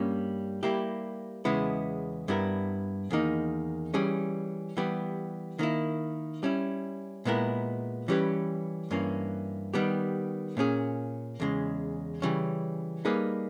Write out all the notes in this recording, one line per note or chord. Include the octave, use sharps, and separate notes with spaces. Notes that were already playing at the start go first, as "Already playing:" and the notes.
Already playing: G2 G3 A#3 C#4
G3 A#3 E4 G4
E2 C#3 G#3 B3 E4
G2 G3 B3 E4 A#4
E2 D#3 A#3 D#4
E3 G3 C#4 G#4
E3 G3 B3 G4
D#3 A#3 E4
G3 C#4 E4
A#2 G#3 B3 E4 A#4
E3 G3 C#4 G4 B4
G2 E3 A#3 C#4
D#3 G3 B3 G4
A#2 A#3 C#4 G#4
E2 C#3 G#3
C#3 E3 G3 C#4
G3 A#3 D#4 G#4 B4